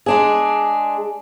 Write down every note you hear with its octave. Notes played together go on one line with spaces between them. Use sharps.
G#3 D4 G#4